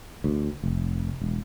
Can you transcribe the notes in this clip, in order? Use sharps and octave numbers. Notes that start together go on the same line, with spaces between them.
D2
F1
E1